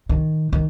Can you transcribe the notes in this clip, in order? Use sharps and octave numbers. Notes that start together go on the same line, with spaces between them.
D#3
D#3